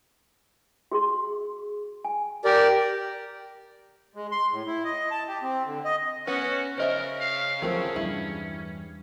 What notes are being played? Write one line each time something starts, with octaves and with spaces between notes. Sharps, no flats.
F#4 G#4 C6
G#5
G4 A#4 D5
G#3
C6
A2
E4
D#5
A5
G4
C4
D3
D#5
B3 C#4 F#4 B4
C#3 A#4 C5 D#5 E5
F5
C#2 F3 F#3 A3 C4 C#4 A#4
E2 G2 E4